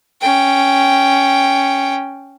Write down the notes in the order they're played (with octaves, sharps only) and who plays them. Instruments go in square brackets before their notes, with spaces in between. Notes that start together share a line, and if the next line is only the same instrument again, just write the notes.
[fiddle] C#4 G5